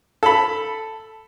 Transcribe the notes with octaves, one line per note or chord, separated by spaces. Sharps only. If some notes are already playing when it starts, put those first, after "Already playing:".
A4 B5